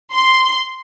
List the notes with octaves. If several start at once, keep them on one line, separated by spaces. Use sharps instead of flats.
C6